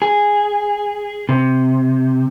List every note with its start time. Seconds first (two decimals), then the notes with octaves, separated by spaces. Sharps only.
0.02 G#4
1.29 C3